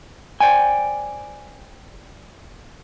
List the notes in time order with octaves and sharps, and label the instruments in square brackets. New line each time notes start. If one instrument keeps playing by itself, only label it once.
[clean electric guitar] C5 D5 G5 G#5